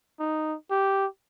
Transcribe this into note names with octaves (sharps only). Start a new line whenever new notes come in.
D#4
G4